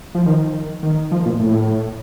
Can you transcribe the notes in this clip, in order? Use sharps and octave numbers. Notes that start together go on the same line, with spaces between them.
F3
D#3
D#3
F3
A#2
A2